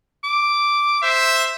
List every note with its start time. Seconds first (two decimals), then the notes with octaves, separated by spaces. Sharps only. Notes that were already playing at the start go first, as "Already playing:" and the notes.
0.24 D6
1.03 C5 E5